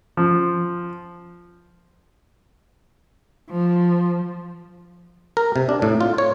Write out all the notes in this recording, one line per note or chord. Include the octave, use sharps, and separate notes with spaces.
F3
F3
A#4
C3
D4
A2
F4
C#5